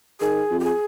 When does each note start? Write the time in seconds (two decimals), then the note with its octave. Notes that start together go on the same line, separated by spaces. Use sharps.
0.20 D#3 G#4
0.50 F2
0.60 G4
0.64 G#4